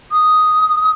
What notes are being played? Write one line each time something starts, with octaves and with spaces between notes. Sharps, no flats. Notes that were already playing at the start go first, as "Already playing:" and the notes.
D#6